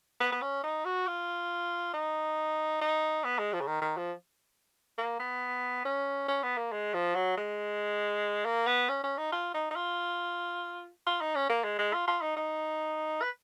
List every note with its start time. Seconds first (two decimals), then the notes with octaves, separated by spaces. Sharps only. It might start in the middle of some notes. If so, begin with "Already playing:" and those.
0.20 B3
0.32 B3
0.42 C#4
0.64 D#4
0.85 F#4
1.07 F4
1.94 D#4
2.81 D#4
3.24 B3
3.39 G#3
3.53 F3
3.61 C#3
3.67 D#3
3.82 D#3
3.97 F3
4.98 A#3
5.20 B3
5.85 C#4
6.28 C#4
6.43 B3
6.57 A#3
6.72 G#3
6.94 F3
7.15 F#3
7.38 G#3
8.45 A#3
8.67 B3
8.89 C#4
9.04 C#4
9.18 D#4
9.32 F4
9.54 D#4
9.71 D#4
9.76 F4
11.07 F4
11.21 D#4
11.35 C#4
11.50 A#3
11.64 G#3
11.79 G#3
11.94 F4
12.08 F4
12.21 D#4
12.37 D#4
13.22 B4